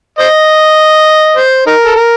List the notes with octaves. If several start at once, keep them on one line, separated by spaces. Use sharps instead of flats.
C5 D#5
C5
D#4 A#4
A4
A#4